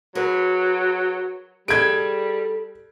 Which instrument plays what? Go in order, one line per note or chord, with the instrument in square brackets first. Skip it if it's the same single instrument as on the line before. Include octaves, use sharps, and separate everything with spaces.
[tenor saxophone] F#3 [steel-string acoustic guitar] G#4 A#4 B4
[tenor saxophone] G3 [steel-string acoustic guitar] G#4 A4 [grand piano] G#6 D7